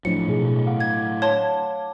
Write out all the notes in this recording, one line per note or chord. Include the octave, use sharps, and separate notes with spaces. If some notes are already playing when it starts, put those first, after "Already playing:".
A2 F3 F#3 D4 C#7
B2 G#4
F5 F#5 D6
G#6
C#5 A5 C6